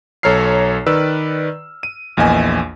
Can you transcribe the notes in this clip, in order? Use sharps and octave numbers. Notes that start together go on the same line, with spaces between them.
B1 A4 C#5 A#5 F6 C7
D#3 B4 D5 E6
D#7
A#1 E2 A#3 D#5 G#5